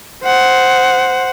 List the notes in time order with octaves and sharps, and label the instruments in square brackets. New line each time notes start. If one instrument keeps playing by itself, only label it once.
[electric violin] C5 F#5